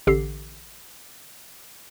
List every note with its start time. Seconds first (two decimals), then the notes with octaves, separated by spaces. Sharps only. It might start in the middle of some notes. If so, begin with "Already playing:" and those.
0.07 A1 D3 G4 A4 C7